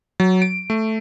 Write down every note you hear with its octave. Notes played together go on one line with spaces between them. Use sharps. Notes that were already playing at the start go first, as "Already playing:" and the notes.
F#3
D7
A3